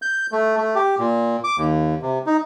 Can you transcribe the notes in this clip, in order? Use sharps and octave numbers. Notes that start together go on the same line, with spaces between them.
G6
A3
A3
G4
A#2
D6
D#2
C3
D#4